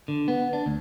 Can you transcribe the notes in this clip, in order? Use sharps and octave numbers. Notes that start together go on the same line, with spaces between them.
D3
B3
D4
D2